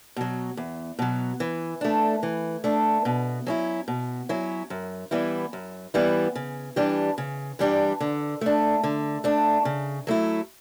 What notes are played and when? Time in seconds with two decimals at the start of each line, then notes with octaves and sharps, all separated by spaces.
0.16 B2 F#3
0.57 E2
0.99 B2 F#3
1.40 E3
1.81 A3 D4
2.23 E3
2.64 A3 D4
3.05 B2
3.47 F#3 C#4 E4
3.88 B2
4.29 F#3 C#4 E4
4.70 F#2
5.11 E3 G3 B3 E4
5.53 F#2
5.94 E3 G3 B3 E4
6.35 C#3
6.76 E3 G3 D4 G4
7.18 C#3
7.59 E3 G3 D4 G4
8.00 D3
8.41 A3 D4
8.83 D3
9.24 A3 D4
9.65 C#3
10.07 F#3 A3 E4